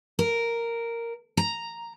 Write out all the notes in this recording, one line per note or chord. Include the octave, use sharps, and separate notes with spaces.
A#4
A#5